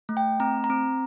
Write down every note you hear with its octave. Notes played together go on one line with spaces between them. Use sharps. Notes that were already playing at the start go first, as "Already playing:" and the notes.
A3
G5
C4 A#5
A#5
C4